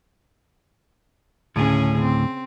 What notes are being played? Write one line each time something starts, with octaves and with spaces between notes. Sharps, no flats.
D2 A2 C#3 C#4 G#4
C4